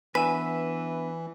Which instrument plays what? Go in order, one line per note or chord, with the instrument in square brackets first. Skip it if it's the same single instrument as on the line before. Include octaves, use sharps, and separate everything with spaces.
[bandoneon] E3 [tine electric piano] B3 D4 [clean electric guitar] B4 E5 [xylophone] G#5